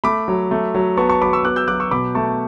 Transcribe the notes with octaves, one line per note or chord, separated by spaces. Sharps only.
A3 B5 D6
F#3
A3
F#3
B3 A5 C#6
A5 C#6
F#3 B5 D6
C#6 E6
B3 D6 F#6
E6 G6
F#3 D6 F#6
C#6 E6
B2 B5 D6
A3 A5 C#6